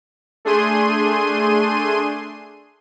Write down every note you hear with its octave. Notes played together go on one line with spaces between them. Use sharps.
A3 D4 G#4 C6 D#7